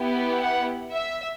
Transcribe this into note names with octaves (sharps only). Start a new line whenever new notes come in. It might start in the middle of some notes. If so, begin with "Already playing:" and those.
Already playing: B3 E4 G4
F#5
E5